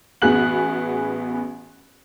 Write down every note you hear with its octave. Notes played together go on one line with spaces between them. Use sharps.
A1 B3 F#4 G#4 F#6 F#7